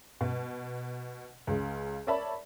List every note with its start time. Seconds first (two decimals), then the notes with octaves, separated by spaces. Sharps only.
0.21 B2
1.47 C#2 C#3
2.07 A#4 C#5 D5 E5 A5 B5